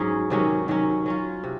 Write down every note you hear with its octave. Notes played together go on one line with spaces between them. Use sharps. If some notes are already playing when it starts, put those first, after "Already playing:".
Already playing: G#2 F#3 C#4 G#4
C3 D#3 F#3 C#4
D#3 F#3 C#4
F#3 C#4 F4
C3